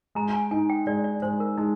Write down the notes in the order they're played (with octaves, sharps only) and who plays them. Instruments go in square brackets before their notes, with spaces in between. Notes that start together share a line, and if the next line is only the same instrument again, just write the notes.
[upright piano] G#3 [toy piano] A#5
[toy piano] G#5
[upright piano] D#4 [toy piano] G#5
[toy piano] G5
[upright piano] G#3 [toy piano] D5
[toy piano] D5
[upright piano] G#3 [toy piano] C5
[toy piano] A#4
[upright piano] G#3 [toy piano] D#4